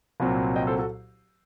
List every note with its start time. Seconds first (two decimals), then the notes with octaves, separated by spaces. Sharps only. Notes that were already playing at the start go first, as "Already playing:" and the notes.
0.20 C2 A#2 F#3 C4
0.56 D#5 G5
0.67 A4 C5
0.79 F#4 A4